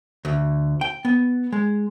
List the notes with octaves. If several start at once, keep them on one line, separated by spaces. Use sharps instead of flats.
D2
G5
B3
G#3